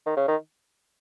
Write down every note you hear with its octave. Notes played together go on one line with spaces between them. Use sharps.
D#3
C#3
D#3